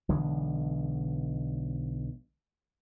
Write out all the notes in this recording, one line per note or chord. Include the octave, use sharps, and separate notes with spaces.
B1 D3 E3 G#3